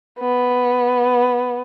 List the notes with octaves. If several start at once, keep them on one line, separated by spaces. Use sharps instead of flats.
B3